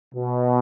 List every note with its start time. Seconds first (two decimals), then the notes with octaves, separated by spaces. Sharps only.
0.14 B2